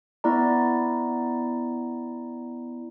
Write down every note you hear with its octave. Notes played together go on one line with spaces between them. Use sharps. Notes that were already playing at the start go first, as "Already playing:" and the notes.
B3 E4 D5 A#5